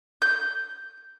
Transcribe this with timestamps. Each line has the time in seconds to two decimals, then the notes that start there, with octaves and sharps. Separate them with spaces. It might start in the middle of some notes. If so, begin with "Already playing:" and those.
0.22 G6